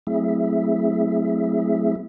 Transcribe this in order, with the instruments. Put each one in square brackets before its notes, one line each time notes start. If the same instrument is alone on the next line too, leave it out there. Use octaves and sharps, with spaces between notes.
[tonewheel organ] F#3 A3 C4 E4 G#4 E5